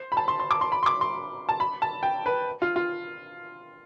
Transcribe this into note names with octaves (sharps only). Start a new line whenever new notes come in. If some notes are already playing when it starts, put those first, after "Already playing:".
Already playing: C5
B5
A5
C6
C6
D6
C6
B5
C6
D6
C6
A5
B5
A5
G5
B4
F4
F4